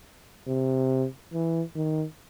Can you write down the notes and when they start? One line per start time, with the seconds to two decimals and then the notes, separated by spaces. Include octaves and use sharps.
0.48 C3
1.33 E3
1.75 D#3